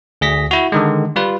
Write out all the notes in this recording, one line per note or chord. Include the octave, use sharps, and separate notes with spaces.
D2 G#4 A#6 B6
E4 F#4
D3 D#3 G#3
G3 F4 B4